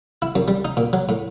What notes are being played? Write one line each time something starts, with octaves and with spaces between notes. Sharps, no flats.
E4
F#2
G3
D#4
A#2
F#3
A2